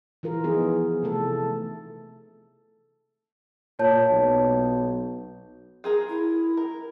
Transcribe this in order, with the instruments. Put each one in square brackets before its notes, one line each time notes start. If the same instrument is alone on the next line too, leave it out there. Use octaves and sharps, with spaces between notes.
[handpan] E3 F4 A#4
E3 F3 B3 D#4 G#4
C3 A3 A4
[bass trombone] A#2 [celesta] C#5 A5 G6
[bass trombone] B1
[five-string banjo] F4 G#4 A#4
[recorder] E4
[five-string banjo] A#4